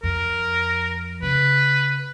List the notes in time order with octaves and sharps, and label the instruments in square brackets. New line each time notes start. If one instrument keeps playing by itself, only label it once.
[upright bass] F2 [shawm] A#4
[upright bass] C#3 [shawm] B4